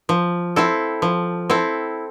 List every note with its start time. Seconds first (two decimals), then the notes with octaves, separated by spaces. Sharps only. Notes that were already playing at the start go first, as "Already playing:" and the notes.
0.09 F3
0.56 C4 E4 A4
1.02 F3
1.50 C4 E4 A4